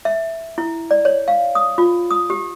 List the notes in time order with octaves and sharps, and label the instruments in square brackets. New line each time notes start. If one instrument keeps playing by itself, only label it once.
[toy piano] E5
E4
D5
C#5
F5
D#6
F4
D#6
G4